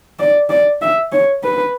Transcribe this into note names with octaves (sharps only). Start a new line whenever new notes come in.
D5
D5
E5
C#5
B4